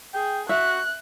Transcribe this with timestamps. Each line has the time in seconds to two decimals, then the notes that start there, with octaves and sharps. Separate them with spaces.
0.14 G#4 G5
0.49 F#4 E5 F#6